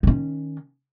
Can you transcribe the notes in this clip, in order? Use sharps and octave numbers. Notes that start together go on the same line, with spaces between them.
D#3 C#4